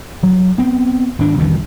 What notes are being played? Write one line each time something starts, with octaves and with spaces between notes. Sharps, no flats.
F#3
B3 C4
G#1 D4
C2 F2 D#3 E3